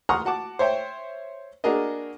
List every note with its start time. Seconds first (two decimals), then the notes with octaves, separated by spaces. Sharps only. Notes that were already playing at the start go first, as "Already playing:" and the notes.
0.09 F#5 A#5 C6 C#6 D#6 F6
0.25 F#4 F#5 A5 D6
0.59 C5 C#5 E5 G5
1.64 A#3 D4 F#4 G#4 A#4 D#5